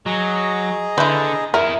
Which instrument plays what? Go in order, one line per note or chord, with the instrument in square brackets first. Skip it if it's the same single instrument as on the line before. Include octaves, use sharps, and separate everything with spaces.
[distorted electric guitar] F#3 [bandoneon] G#4 D#5 A#5
[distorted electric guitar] D3 [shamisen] E4 B4 [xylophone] C6 G6
[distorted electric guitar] E4 G#4 [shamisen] A#4 [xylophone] E5